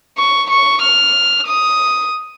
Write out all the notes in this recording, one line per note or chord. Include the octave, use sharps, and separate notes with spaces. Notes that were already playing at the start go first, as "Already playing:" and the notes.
C#6
C#6
F6
D#6